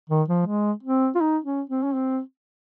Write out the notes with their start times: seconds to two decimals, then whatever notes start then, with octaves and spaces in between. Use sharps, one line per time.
0.10 D#3
0.29 F3
0.46 G#3
0.84 C4
1.15 F4
1.21 D#4
1.45 C#4
1.70 C4
1.83 C#4
1.94 C4